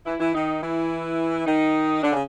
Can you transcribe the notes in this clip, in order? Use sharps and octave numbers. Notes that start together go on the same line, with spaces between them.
E3 E4
E3 E4
D#3 D#4
E3 E4
D#3 D#4
D3 D4
C#3